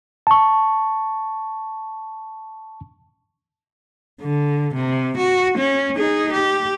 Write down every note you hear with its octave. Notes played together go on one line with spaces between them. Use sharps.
A5 C#6
D3
C3
F#4
C#4
D#4 G#4
G4